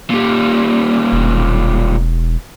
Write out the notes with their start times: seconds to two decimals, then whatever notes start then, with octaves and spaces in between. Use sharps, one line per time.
0.10 A#2 G3
1.12 E1